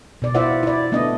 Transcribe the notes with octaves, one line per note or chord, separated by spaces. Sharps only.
B2 D5
E4 F4 C5 D5 E5 F#5
E4 D5
A3 B3 D4 D#5